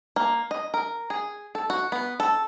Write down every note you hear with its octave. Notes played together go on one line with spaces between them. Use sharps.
A#3
D#5
A#4
G#4
A4
F#4
B3
A4